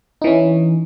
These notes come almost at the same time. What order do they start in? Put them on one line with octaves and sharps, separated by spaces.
D#4 E3 C#4